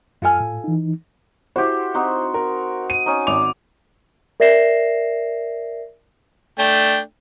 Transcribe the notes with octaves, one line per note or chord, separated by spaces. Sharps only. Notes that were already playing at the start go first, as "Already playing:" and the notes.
F#2 F4 A4 G#5 F6
A2
E3 D#4
E4 F#4 G4 C5
C4 D#4 F#4
A#4
D#7
C#4 D#4
G#1 D6 F7
A#4 D5 E5 A#6 C7 E7
A3 D4 G5